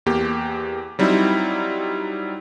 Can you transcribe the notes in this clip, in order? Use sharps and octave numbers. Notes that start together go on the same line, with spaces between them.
E2 A#3 G4
F#3 G3 C4 D#4 E4